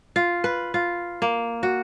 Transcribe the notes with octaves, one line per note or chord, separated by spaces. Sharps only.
F4
B4
F4
A#3
F#4